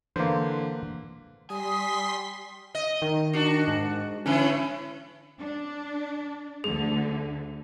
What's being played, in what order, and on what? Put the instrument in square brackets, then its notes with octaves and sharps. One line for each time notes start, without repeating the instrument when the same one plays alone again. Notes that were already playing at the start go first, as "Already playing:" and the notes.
[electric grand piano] D3 B4 C6 [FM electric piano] E3 [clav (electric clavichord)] A#3 C5
[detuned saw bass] G3 [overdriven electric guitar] G#5 [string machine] C6 B6 [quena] D#6
[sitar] D#5
[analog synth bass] D#3
[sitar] D4 F#4
[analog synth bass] G#2
[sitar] D3 E3 E4 [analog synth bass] C#4
[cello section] D4
[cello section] D2 D3 [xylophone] G#4